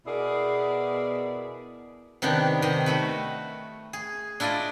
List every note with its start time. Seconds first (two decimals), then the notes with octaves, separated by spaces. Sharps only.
0.07 B2 B3 E4 G#4 A#4 D5
2.22 C3 D#3 B3 D4
2.62 C3 D#3 D#5
2.86 A3 F#4 B4
3.93 G#4
4.40 D4 E4 F4 D5 D#5